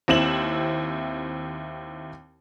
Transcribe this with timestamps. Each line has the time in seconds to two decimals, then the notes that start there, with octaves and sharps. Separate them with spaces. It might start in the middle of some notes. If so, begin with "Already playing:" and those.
0.08 D#2 C4 E4 E7 F#7